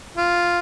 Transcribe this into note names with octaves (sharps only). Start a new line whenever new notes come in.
F4